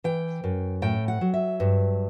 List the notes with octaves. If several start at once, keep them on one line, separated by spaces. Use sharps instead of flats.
E3 G5
F#2
A2 G5
F#5
F#3
E5
G2